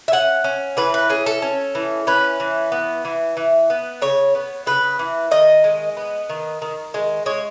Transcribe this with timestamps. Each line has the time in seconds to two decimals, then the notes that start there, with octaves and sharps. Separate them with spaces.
0.08 E5
0.12 C#4 F#5
0.44 C#4
0.77 E3 B4
0.94 B4
1.09 C#4 G#4
1.26 A4
1.42 C#4
1.75 E3
2.07 C#4 B4
2.40 E3
2.72 B3
3.05 E3
3.37 E3
3.70 B3
4.02 C#3 C#5
4.35 B3
4.66 C#3 B4
4.99 E3
5.31 D#3 D#5
5.64 G#3
5.97 B3
6.30 D#3
6.62 D#3
6.94 G#3
7.26 G#3 C#5